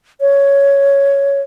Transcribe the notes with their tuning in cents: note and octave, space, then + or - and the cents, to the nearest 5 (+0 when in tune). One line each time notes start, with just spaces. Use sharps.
C#5 +5